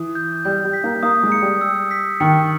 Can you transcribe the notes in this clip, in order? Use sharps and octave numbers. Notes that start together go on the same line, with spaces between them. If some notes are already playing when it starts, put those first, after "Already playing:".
Already playing: E3 D#6
G6
G3 G6
G3
B6
A#3
A#3 D#6
G#3
C#7
G3
E6
B6
D#3 C#7